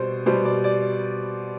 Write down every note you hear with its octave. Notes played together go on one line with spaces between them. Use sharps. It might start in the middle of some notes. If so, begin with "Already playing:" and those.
Already playing: B2 G3 C5
B2 G3 C5
D5
D5